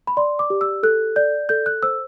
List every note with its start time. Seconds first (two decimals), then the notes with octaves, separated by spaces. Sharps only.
0.07 B5
0.17 D5 C6
0.39 D6
0.50 G4
0.61 E6
0.83 A4 F#6
1.16 D5 G6
1.49 A4 G6
1.66 F#6
1.83 C5 E6